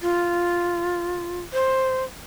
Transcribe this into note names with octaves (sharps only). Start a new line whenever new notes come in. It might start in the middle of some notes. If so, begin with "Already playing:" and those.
F4
C5